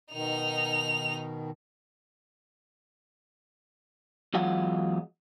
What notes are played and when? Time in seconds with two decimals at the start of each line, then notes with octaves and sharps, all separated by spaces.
0.12 B2 D#3 D#4 F7
4.34 E2 F#3 G#3 F4 F#5